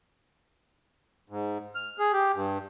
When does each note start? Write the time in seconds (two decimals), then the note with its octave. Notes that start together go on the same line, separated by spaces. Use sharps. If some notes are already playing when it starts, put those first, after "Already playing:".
1.30 G#2
1.75 F6
1.99 G#4
2.13 G4
2.35 G2